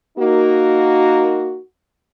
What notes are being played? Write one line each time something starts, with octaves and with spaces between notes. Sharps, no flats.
A#3 D#4 F#4